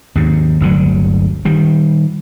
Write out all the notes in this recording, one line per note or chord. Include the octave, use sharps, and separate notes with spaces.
D#2 G#2
G1 D2 D3 F#3
D#3 G3